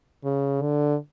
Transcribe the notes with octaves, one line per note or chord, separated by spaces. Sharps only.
C#3
D3